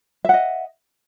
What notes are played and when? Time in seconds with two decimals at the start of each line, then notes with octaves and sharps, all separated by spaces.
0.25 E5
0.29 F#5
0.33 D#5